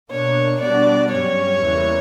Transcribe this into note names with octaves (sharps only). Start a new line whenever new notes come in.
B2 A#3 D4 C#5
B2 G3 B3 D4 F#4 D5
G2 F#3 C#4 G4 C#5
E2 C#3 E3 G3 A#3